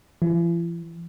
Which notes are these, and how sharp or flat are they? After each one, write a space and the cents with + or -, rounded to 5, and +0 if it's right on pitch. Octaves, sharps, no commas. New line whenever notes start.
E3 +45